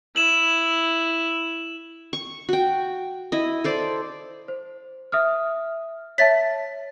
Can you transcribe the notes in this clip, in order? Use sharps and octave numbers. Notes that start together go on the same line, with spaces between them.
E4 E7 F#7
C#6
F#4 G5
E4 D#5
A4 C5 D5
C5
E5 D#6 F6
C#5 E5 A5 A6 B6